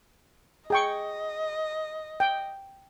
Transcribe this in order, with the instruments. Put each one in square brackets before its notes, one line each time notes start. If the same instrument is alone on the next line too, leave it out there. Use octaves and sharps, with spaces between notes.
[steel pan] G#4 G5 C#6 [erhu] D#5
[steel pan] G5